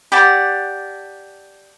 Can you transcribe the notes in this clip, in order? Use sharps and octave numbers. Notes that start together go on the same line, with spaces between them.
G4 D5 F#5 A5